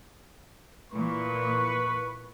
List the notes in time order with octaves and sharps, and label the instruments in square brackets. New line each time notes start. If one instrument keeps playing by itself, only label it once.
[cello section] A#2 E3 [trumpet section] B4 C#6